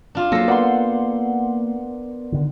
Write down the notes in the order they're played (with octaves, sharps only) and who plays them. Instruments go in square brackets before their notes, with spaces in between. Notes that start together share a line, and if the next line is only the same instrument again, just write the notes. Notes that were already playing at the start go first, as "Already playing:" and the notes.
[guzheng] D4 F4
[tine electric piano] F#3 A#6 [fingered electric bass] A#3 [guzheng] A4 C5
[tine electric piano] B3 A#4 D5 [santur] F#5 C6
[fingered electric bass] D3 D#3